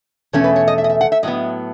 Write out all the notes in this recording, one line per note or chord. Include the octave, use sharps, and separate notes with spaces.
E2 B2 A3 C#4 C#5
B4
C#5
D#5
E5
D#5
E5
F#5
E5
A2 F#3 B3 D#5